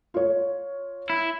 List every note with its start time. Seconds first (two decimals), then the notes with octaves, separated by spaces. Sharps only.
0.14 F4 C#5
1.10 E4